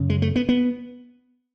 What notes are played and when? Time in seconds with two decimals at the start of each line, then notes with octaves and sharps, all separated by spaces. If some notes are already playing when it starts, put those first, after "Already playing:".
Already playing: F#2 C#3
0.10 G#3
0.22 A3
0.36 B3
0.49 B3